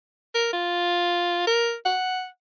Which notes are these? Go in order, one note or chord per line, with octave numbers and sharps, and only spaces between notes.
A#4
F4
A#4
F#5